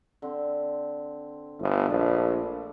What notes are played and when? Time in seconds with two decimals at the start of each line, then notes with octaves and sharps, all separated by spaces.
0.22 D3 C4
1.60 G1 A3 D#5
1.89 A#1 D4 F5 A5